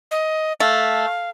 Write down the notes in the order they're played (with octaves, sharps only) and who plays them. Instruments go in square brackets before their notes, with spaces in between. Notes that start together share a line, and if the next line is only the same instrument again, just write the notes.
[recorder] D#5
[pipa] A3 [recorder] F5